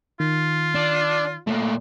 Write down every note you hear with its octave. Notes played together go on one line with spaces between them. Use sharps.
D#3 F4
D4
A#2 A3